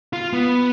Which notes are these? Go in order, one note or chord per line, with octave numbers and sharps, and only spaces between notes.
F4
B3